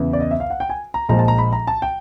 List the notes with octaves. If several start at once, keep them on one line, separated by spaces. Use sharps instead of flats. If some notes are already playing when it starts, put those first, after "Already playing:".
Already playing: E2 C#3 E3
D5
D#5
E5
F5
F#5
G5
G#5
A#5
A#1 A#2 F3 G#3 A#5
A5
A#5
B5
A#5
A5
G5